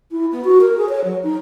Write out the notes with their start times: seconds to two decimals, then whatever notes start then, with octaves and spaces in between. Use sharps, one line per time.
0.11 E4
0.32 B3
0.44 F#4
0.61 A#4
0.77 G#4
0.89 C#5
1.04 F#3
1.23 D#4